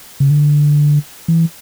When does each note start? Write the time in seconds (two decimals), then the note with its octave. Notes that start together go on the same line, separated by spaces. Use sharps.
0.20 C#3
0.30 D3
1.28 E3